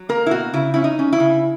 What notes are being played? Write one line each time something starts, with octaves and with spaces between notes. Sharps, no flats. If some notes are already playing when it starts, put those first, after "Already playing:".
Already playing: F#3
A#3 A#4
E4
B2 F#4
C#3 E4
C#4 E4
D#4
C#4
E4
C#3